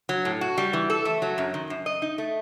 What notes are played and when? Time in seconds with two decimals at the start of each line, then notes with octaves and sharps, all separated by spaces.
0.09 F#3
0.25 A2
0.41 F#4
0.58 G3
0.73 E3
0.90 A4
1.05 A3
1.22 F#3
1.38 F#2
1.54 D#3
1.70 F#2
1.86 D#5
2.02 D#4
2.18 A3